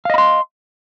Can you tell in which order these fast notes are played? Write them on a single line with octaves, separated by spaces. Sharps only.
F5 D#5 B5 C6